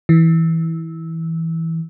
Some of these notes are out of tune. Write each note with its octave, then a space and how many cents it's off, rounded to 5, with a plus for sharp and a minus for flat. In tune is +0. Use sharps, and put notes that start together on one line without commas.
E3 -15